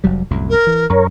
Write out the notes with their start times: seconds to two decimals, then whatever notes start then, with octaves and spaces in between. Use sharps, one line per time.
0.04 F1 F#3 G3
0.31 C2 F#2 A2
0.50 A#4
0.67 E3
0.90 F#2 A#4 C#5